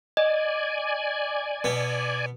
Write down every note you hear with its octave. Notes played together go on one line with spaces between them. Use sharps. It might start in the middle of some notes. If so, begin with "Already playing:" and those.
D5 D#5 G#5
B2 B3